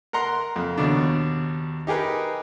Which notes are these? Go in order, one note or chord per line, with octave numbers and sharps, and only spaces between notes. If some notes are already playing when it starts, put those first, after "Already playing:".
A#4 F#5 A#5 C6
F2
D#2 B2 D4
D#4 G4 G#4 A#4 B4